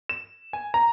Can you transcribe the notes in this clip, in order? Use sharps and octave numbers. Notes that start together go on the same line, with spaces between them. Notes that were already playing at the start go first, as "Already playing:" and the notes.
E7
G#5
A#5